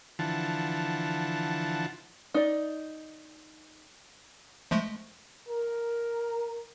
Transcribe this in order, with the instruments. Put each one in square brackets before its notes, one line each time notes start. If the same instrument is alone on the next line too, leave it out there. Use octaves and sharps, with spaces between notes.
[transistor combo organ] D3 E3 F3 F#5 A5
[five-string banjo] D#4 D5
[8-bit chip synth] F3 G#3 A3
[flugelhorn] A#4